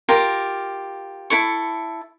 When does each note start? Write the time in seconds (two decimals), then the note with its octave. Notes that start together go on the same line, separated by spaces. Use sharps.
0.09 F4 G4 A#4 A#5
1.30 E4 A4 C#6